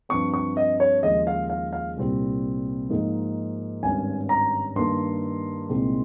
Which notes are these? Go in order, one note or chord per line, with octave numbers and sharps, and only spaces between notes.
G2 F3 C4 C#6
C#6
D#5
C#5
D#2 C#3 F3 G#3 D#5
F5
F5
F5
C2 A#2 G3 C4
G#2 F3 A#3 D#4
G#1 G2 G3 C#4 G#5
A#5
G2 D#3 A#3 C6
C2 A#2 G#3 C4 D#4